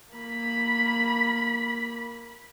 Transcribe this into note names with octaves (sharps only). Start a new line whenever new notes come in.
A#3 B5